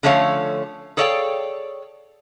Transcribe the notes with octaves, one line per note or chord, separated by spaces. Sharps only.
D3 F3 A3 C#4 C#5 F5
G#4 A4 C#5 D5 F5 G5